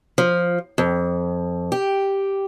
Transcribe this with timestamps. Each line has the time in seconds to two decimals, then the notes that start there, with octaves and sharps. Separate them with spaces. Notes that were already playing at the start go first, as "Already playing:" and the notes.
0.18 F3
0.78 F2
1.72 G4